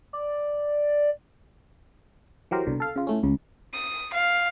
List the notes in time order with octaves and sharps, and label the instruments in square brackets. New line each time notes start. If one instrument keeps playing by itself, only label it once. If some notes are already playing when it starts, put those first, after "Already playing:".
[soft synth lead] D5
[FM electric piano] E3 F#3 G4 A#4 C5
C2 B2 D3
A4 F5
C#3 F4
A2 A3 C#4
C#2 C#3
[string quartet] D#6
F5